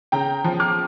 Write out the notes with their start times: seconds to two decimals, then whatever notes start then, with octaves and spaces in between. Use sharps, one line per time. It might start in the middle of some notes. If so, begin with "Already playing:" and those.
0.12 C#3 G5 A#5
0.44 F3
0.60 D6 F6